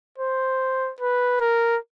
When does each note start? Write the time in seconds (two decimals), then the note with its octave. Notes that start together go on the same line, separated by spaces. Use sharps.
0.18 C5
1.00 B4
1.41 A#4